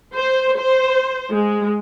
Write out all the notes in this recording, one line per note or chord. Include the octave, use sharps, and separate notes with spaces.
C5
C5
G#3